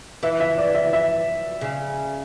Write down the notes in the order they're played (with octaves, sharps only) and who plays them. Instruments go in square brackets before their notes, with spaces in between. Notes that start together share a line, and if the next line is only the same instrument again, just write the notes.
[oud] E3 [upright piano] E5
[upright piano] E5
D5
E5
E5
[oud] C#3